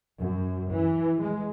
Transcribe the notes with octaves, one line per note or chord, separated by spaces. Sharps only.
F#2
E3
G#3